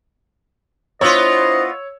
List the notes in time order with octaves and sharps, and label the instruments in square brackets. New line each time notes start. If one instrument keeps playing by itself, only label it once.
[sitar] B3 F4 [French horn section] D4 E4 C5 [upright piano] C#5 E6 [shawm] D#5